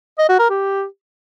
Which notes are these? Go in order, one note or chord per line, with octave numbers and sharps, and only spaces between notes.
D#5
F#4
A#4
G4